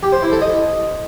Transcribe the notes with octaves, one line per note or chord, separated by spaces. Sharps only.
G4
C5
E4
A4
D#5